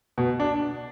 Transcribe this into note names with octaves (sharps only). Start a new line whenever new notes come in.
B2
D4